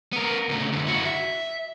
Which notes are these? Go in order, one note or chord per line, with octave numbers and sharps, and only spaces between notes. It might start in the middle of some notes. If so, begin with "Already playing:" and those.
B3 A#4
C#2 A3
F#2 D3
E4 F#4
E5